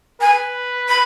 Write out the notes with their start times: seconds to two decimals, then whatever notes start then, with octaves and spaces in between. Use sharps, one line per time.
0.21 B4 G#5
0.89 B5